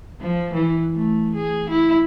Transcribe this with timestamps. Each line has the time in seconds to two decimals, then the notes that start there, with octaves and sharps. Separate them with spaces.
0.21 F3
0.54 E3
0.95 A3
1.35 G#4
1.70 E4